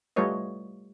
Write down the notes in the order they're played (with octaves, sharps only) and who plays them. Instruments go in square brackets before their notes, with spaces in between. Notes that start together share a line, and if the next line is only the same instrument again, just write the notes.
[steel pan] G3 A3 F4 B4 C#5 D#5